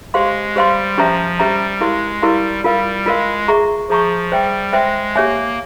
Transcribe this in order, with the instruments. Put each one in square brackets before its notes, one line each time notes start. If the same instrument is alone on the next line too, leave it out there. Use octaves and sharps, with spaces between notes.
[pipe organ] G#3 [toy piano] G4 C5 F5 C6
[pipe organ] G3 [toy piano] G4 C5 F5 C6
[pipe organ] F3 [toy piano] C#4 G4 C5 E5 A#5
[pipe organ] G3 [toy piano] C#4 G4 C5 E5 A#5
[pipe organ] G#3 [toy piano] E4 G4 A#4 F5 C6
[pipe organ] G3 [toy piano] E4 G4 A#4 F5 C6
[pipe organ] G3 [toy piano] F4 A#4 F5
[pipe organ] G#3 [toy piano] F4 A#4 F5
[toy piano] G#4 E5 A#5 C#6
[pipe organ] F3 [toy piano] G#4 E5 A#5 C#6
[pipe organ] G3 [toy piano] C5 E5 G5
[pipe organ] G#3 [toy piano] C5 E5 G5
[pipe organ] A#3 [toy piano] G4 C#5 E5 G#5